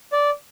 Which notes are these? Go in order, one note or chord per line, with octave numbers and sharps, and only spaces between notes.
D5